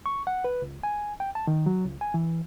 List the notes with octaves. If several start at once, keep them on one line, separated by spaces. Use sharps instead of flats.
C#6
F#5
B4
C#2
G#5
G5
A5
D#3
F#3
C#2
G#5
E3